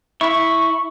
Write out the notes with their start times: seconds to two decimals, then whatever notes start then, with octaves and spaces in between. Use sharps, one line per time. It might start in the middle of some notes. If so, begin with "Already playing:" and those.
0.21 E4 C#6